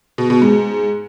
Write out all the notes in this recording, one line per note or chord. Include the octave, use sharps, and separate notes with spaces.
B2
B2
G#2